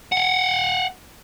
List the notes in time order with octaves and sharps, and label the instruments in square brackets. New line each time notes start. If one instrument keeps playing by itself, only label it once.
[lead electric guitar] F5 F#5